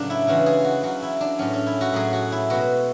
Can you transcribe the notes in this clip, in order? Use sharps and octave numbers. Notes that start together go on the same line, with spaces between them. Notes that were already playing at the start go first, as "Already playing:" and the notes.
Already playing: A2 C#3 F#3 D4
E4
C#3 E3 G#3 F#4
G#4
F#4
C#3 F#3 F#4
E4
D4
A2 F#3 C#4
C#4
E4
F#4
A2 F#3 G#4
F#4
E4
B2 G#3 F#4